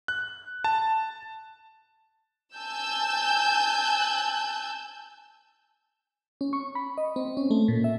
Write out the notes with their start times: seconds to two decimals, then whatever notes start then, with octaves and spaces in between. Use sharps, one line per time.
0.08 F#6
0.64 A5
2.56 G#5 A5 E6 G6
6.41 C#4
6.53 C#6
6.75 B5
6.98 D#5
7.16 C4
7.37 C#4
7.51 A3
7.68 A#2
7.84 E5